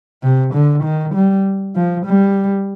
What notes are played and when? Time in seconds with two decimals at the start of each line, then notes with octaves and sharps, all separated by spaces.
0.23 C3
0.54 D3
0.84 D#3
1.15 G3
1.76 F3
2.06 G3